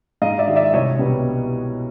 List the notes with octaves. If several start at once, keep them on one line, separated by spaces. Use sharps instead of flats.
G#2 D#5 F5
D5 E5
D#3 G#3
D5 E5
C2 C#5 D#5
B2 G3 B3